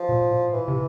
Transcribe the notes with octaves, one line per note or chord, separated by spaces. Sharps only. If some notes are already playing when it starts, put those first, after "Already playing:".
Already playing: F3
A#2
A2
A#2
A2
A#2 E3
C3